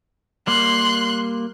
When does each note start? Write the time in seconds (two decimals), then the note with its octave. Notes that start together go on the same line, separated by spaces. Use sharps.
0.47 G3 A#3 C6 F#6